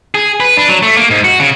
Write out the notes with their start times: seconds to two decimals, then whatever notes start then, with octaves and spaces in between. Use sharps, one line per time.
0.15 G#4
0.40 B4
0.57 D4
0.68 F#3
0.83 A3
0.97 A#3
1.10 G#2
1.24 F#4
1.39 C#3